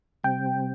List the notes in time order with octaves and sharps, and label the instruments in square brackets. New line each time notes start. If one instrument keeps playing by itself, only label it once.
[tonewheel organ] C3 G3 C4 [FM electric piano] G5